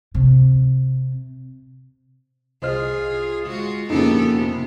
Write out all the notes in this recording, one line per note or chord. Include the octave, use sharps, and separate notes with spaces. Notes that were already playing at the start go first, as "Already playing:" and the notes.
C3
C2 F4 G#4 C5 D#5 F6
G#3 F4 F#4
A#1 F2 C#3 A#3 B3 D#4 G4 A4
C3 B3